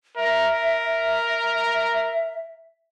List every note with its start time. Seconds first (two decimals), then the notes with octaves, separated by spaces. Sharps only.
0.17 A#4 E5